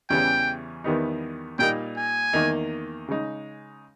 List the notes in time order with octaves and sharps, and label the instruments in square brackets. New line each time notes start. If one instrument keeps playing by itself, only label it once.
[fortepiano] E2 C#3 E3 G3 C#4 [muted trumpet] G5
[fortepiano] E2 D#3 G3 B3 D#4
[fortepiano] A#2 G3 A#3 D#4 [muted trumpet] G5
[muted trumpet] G#5
[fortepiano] E2 D#3 A#3 D#4
C#3 G#3 D#4